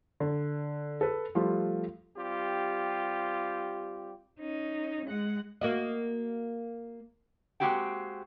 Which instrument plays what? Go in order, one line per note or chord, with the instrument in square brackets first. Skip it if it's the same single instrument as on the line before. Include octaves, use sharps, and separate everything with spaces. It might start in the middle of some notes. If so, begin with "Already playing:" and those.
[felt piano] D3
A4 B4
F3 G3 A3 F4
[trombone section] G3 C4 F4 G4
[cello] C#4 D#4
G#3 F#5
[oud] A#3 F#4 D#5
[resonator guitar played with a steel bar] G#3 A#3 C4 F#4 G4 G5